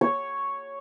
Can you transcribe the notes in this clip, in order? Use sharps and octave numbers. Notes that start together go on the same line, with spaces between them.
C#5